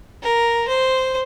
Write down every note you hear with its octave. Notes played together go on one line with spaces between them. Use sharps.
A#4
C5